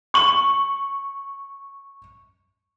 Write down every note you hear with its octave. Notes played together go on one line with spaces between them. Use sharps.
C#6 F#7